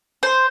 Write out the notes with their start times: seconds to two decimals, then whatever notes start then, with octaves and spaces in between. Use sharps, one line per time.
0.23 C5